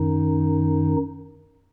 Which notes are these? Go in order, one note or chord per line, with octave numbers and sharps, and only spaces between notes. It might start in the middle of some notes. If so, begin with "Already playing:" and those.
Already playing: F#2 D#3 D#4